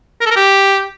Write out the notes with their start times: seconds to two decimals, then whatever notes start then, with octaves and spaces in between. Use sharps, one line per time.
0.21 A#4
0.26 A4
0.31 A#4
0.36 G4